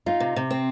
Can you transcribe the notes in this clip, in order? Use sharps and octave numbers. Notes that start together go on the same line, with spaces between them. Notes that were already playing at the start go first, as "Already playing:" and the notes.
D#4 F4
C3
C3
C4